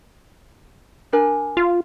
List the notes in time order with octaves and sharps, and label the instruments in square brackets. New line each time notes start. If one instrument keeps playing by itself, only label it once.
[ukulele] D4 A#4 G#5
[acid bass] F4